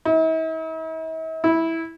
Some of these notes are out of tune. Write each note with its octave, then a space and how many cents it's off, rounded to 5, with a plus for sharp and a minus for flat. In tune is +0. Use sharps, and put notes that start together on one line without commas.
E4 -45
E4 -10